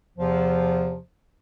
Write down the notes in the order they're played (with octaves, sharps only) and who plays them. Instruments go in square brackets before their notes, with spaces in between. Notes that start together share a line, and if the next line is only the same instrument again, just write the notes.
[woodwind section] E2 C3 F3